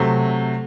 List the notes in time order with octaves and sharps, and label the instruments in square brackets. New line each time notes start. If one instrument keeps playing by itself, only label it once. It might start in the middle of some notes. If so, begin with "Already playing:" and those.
Already playing: [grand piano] C3 F#3 A3